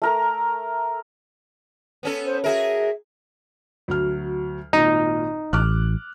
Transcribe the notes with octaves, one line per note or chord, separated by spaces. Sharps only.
A3 A#4 A#5
B3 C#4 A4
C5
F#4 G#4 A#4 E5
D2 F#3 F6
G#1 A#2 D#4
A1 D6 F6 F#6